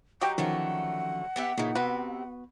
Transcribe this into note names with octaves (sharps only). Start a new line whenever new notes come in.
F#3 D#4 F#4 G4 G5
D3 D#3 F3 F#3 A3 C#4 F#5
B3 G4 E5
A#2 C#3 E3 D#4
C3 B3 C4 F#4 B4